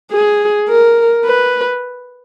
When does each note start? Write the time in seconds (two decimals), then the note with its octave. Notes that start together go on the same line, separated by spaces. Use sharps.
0.12 G#4
0.69 A#4
1.25 B4